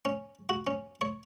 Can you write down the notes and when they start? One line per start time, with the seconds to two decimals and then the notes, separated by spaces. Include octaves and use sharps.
0.05 C#4
0.49 F#4
0.67 C#4
1.01 C#5